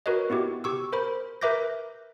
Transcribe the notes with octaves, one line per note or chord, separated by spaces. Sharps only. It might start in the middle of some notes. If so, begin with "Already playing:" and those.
F#4 A#4 B4 C#5 D#5
B3 E4 F#4 G4
G4 C#6 E6
A#4 C5 B5
A#4 B4 E5 D6 G6 A#6